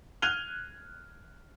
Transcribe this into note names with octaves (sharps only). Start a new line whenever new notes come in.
F6 F#6 G#6 D#7 F7 G7